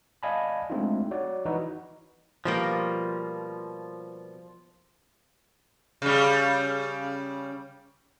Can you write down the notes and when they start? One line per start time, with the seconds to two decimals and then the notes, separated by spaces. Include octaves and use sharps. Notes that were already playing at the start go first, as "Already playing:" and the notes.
0.23 D5 D#5 F5 G#5 A5 B5
0.70 G#3 A3 C4 D4 D#4 F4
1.11 F#4 C#5 D5
1.45 E3 D#4 F#4 B4 D#5
2.45 B2 F3 G3 A#3
6.02 C#3 G3